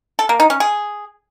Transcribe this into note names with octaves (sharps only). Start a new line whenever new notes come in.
A4
A#3
D#4
C#4
G#4